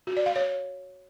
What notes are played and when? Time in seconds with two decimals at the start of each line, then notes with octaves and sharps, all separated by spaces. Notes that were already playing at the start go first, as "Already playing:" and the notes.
0.07 F#4
0.17 D5
0.26 F5
0.36 C#5